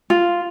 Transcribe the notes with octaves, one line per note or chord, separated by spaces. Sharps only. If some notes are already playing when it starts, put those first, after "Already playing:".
F4